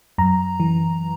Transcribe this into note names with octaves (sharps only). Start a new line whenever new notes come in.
F#2 A#5
E3